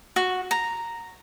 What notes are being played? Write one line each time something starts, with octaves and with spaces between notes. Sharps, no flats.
F#4
A#5